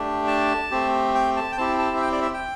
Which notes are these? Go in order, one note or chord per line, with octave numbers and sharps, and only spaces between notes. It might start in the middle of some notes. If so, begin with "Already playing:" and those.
Already playing: A3 D4 G4
A5
A3 C4 G4
G5
A5
G5
C4 E4 G4 A5
A5
E5
G5
D5
E5
G5